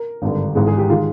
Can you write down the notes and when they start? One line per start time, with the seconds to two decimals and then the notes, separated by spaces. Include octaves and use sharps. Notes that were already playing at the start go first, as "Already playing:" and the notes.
Already playing: A#4
0.22 G#1 G2 D3
0.55 G#1 G#2 E3 G#3
0.67 G#4
0.78 G4
0.90 D#3 G#3 F4